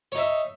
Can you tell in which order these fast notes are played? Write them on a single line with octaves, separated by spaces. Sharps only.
C#5 D#4 E5